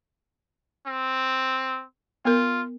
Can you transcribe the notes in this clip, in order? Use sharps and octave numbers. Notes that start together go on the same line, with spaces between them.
C4
B3 F4 A#4